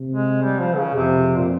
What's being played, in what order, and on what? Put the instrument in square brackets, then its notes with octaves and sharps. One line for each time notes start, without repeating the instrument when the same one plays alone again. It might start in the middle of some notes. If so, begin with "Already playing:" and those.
Already playing: [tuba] C3
[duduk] G#3
G3
F3
C#3
[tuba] F2 [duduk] C3
[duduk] A#2